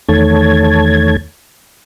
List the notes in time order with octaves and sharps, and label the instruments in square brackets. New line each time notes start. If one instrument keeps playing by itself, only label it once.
[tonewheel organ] E2 D#3 A3 C#5 A5 G#6